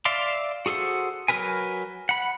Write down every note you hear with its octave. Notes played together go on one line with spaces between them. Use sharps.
D5 E5 F5 C6 D6
F#4 G#4 A4 C5 F#5
F#3 F#4 A#4 B4 G#5
F#5 B5